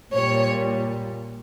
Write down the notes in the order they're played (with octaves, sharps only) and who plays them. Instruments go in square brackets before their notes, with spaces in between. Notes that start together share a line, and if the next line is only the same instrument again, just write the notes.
[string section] A#2 G3 C#5